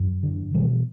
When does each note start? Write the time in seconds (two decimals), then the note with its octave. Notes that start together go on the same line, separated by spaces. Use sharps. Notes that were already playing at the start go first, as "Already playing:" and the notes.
Already playing: F#2
0.23 D3
0.55 B2 E3 G3